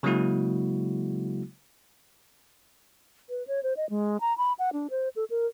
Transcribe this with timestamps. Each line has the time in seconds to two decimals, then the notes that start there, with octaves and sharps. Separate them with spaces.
0.03 C#3 F#3 G#3 A#3 E4 F#4
3.29 B4
3.47 C#5
3.63 C5
3.77 D#5
3.90 G#3
4.21 A#5
4.38 B5
4.59 F#5
4.73 D4
4.90 C5
5.16 A4
5.30 A#4